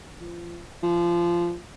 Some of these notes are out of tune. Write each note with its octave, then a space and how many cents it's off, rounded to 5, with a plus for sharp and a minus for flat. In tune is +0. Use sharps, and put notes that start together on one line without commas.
F3 -25
F3 -20